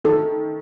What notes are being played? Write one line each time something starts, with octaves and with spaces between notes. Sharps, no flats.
D#3 A4